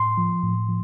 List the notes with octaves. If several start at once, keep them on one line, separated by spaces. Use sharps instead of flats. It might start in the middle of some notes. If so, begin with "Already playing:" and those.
Already playing: A2 C6
F3
A2
F3